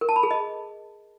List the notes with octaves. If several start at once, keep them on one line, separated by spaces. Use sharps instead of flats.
A#4
A5
B5
G#4
D#5